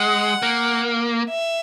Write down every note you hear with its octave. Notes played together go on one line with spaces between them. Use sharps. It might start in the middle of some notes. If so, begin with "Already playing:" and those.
Already playing: G#3 F#5
A#3
E5